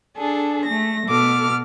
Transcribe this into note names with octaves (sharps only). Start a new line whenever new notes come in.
D4 G#4 A4
A3 A#6
B2 A4 D6 F6